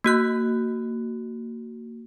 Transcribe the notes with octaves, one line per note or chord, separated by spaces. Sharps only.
A#3 F#4 F#6